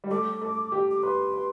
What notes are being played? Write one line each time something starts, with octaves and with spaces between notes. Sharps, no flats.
G3
A3 D6
A3
G4
D6
B4 C6
B4